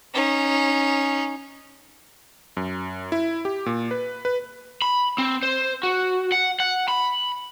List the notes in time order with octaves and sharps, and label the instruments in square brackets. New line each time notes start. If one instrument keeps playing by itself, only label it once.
[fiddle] C#4 D#4
[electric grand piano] F#2
E4
G4
A#2
B4
B4
[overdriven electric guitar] B5
C4
C5
F#4
F#5
F#5
B5